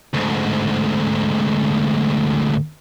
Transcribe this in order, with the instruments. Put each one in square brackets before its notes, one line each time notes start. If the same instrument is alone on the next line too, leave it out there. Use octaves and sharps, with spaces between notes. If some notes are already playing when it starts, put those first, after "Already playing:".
[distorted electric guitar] D2 G#2